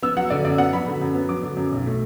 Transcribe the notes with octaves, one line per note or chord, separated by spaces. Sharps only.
B3 E6
F#3 F#5
D3 D5
F#2 D5
B3 F#5
F#3 B5
D3
F#2
B3
F#3 D6
D3
F#2
B1
A3